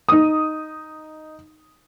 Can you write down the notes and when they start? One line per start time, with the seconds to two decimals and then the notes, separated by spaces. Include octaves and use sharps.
0.09 D#4 D#6